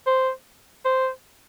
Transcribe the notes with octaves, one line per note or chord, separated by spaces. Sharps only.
C5
C5